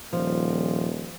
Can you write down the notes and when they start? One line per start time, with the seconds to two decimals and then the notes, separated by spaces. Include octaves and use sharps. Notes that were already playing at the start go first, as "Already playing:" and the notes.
0.13 D#1 F3